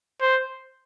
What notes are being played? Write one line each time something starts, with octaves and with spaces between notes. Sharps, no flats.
C5